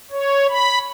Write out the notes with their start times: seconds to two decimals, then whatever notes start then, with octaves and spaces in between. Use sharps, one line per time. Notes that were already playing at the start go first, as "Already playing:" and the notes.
0.11 C#5
0.49 B5